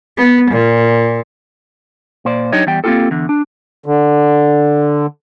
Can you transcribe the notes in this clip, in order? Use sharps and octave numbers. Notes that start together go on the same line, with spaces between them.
B3
A#2
A#2 C5 D5
F#3 D4 D#4 G4 C#5 D#5
E2 G3 G5
A#3 C4 D#4 F4 G4 A4
E2 D3
D4
D3